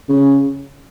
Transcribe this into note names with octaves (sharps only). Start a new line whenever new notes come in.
C#3